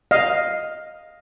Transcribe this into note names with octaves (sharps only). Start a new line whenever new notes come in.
D#5 F5